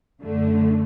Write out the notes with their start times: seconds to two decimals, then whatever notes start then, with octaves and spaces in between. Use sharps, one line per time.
0.22 F#2 D3 A3